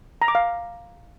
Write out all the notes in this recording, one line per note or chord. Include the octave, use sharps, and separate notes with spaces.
A#5
D6
F5